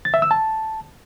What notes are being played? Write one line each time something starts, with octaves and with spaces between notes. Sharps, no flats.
A6
E5
E6
A5